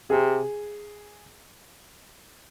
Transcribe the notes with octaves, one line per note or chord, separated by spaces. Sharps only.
C3 G#4